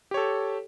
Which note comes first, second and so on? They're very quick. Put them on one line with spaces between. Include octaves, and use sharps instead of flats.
G4 C#5 A4